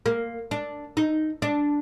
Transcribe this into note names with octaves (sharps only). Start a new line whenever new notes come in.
A#3
D4
D#4
D4